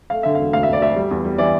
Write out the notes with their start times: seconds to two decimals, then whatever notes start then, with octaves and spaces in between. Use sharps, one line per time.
0.10 A3 F5
0.23 D3 E5
0.35 F5
0.39 E1
0.53 D2 F5
0.63 E5
0.68 D2
0.73 D5
0.81 D2 E5
0.96 G3
1.11 E2
1.25 G3
1.38 E3 D5